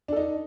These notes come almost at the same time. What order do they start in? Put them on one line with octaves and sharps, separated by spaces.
D4 A4 D#4